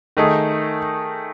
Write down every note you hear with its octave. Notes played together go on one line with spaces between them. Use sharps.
D#3 A3 D#4 G#4